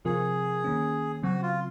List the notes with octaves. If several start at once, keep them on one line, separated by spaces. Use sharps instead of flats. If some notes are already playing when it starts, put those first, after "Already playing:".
C3 F3 C4 F4 G#4 A#4
D#3 A#3 C#4
C#3 F#3 C4 F#4
F4